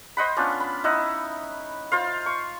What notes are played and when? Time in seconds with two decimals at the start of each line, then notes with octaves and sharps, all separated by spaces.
0.17 C5 D#5 F#5 B5
0.37 B3 C#4 D4 F4
0.60 B5
0.84 D#4 E4 D#5 F#5
1.92 F4 C5 F5
2.26 C#6